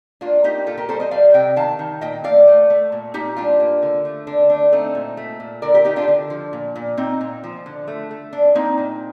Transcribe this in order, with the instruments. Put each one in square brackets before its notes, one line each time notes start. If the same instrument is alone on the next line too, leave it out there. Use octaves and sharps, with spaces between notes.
[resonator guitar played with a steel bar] A#3 D4 F4
A#3 D#4 G4
A#2 F4 A4
G4 A#4
G3 A4 C5
C5 D#5
G3 D5 F5
C3 D#5 G5
D#3 F5 A5
D#3
A#2 D#5 G5
A3 D5 F5
A3
A3
A#2
A#2 D#4 G4
G3 D4 F4
A#3
D3
A3
D3 D4
A3 D4
A3 C4 D#4
A#2
A3
A#2
D3 A#4 D5
G4 A#4
D3 D#4 G4
D4 F4
D3
F3
A#2
A#2
A#2 C4 D#4
A#2
F3
D3
A3
A3
A#2 D4
A#3 C4 D#4
A#2